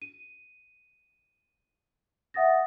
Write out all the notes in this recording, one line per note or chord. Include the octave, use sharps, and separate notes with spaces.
D#7
E5 F#5 D#6 A6 A#6